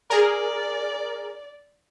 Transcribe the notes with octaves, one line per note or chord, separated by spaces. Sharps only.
G#4 A#4 D5